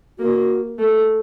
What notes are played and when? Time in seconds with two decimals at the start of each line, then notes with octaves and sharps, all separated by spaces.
0.19 A#3 F#4
0.79 A3